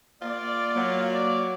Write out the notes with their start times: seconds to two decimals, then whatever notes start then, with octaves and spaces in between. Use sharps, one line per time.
0.22 A#3 F4 D5
0.75 F#3 A#3
1.12 D5